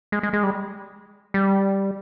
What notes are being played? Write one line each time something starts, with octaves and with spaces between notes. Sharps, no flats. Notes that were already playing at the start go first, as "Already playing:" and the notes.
G#3
G#3
G#3
G3
G3